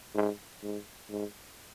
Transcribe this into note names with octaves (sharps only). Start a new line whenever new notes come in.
G#2
G#2
G#2